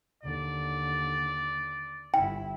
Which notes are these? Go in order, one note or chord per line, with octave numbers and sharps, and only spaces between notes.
D#2 D3 D5
G1 E4 G5